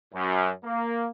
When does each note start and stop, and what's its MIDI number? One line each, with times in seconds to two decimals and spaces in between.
0.14 0.49 42
0.64 1.08 58